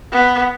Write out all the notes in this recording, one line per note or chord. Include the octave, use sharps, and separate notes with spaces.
B3